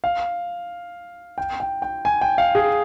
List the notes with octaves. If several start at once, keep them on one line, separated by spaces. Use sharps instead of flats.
F5
G5
G5
G5
G#5
G5
F5
G#4